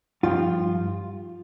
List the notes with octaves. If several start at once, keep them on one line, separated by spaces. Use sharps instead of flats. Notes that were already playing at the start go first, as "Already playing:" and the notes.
G2 F3 F4